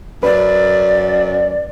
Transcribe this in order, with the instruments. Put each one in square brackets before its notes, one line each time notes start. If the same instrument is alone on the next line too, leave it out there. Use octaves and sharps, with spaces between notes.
[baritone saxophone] F#2 [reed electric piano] B4 [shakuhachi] D5